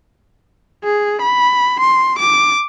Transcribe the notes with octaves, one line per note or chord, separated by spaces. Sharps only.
G#4
B5
C6
D6